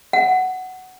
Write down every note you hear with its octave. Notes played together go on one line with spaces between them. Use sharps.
F#5